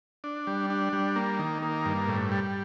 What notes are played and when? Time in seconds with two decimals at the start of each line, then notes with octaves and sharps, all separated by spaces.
0.24 D4
0.47 G3
0.70 D4
0.93 G3
1.16 A#3
1.39 D#3
1.62 A#3
1.85 G2
2.08 A2
2.32 G3